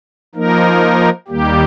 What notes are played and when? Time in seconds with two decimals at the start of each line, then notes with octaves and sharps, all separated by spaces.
0.35 F3 A#3 D#4 A#4
1.28 D#2 D#3 G3 A#3 G4